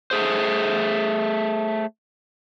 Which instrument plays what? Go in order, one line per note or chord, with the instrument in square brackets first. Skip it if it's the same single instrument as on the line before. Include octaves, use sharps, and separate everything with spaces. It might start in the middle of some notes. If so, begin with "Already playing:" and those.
[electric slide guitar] A3 G#4 C5